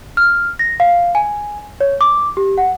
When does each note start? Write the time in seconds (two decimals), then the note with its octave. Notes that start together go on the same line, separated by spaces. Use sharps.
0.17 F6
0.59 A#6
0.80 F5
1.15 G#5
1.81 C#5
2.01 D6
2.37 G4
2.58 F#5